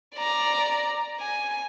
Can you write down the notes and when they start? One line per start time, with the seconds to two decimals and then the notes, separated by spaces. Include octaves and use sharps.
0.17 D5 A#5
1.20 G#5